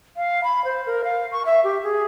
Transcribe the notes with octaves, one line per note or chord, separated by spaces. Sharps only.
F5
B5
C5
A#4
F5
C#6
E5
G4
G#4